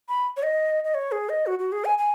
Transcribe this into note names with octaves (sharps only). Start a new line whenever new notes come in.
B5
C#5
D#5
D#5
C#5
G#4
D#5
F#4
F#4
G#4
G#5
G#5